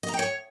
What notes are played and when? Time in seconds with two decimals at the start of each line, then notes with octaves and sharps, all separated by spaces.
0.03 D#5
0.08 A#5
0.14 G5
0.19 C#5